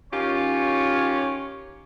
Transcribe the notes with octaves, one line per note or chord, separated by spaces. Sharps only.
D#3 C#4 F4 G4 C#5